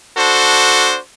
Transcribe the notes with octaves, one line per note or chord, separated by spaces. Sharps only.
D4 F#4 A4 C5